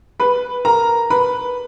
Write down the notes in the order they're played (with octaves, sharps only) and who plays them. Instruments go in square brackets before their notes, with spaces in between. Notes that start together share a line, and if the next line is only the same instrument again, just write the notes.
[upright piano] B4 B5
A#4 A#5
B4 B5